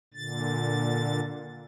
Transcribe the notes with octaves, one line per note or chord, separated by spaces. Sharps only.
A#2 D3 A6